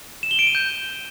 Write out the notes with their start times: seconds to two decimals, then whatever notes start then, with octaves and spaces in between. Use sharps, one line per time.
0.23 E7
0.31 G7
0.39 D7
0.47 D#7
0.55 G6